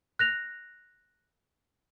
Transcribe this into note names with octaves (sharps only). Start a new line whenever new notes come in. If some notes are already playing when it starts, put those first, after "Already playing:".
F#6 A#6 F7